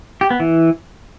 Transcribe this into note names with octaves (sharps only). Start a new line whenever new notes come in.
G4
B3
E3